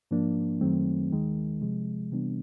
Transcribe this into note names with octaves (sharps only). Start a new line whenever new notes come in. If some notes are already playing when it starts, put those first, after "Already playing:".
G#2 F3 A#3 D4
F#2 D#3 F#3 A3 C4
D#2 D#3 G#3
C3 F3 G#3
C3 E3 G3 B3 D4